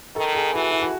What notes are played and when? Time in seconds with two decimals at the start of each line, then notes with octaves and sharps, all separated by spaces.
0.16 D#3 A4
0.35 G#4
0.54 E3 F#4
0.72 E4
0.82 F#4